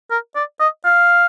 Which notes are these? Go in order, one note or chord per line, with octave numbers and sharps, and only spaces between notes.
A#4
D5
D#5
F5